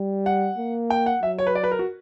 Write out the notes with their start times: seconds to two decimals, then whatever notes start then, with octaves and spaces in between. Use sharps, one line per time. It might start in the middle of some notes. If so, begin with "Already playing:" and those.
Already playing: G3
0.26 F#5
0.58 A#3
0.90 G5
1.06 F#5
1.23 F#3 E5
1.38 C#5
1.47 B4
1.55 D5
1.64 B4
1.71 A#4
1.79 F#4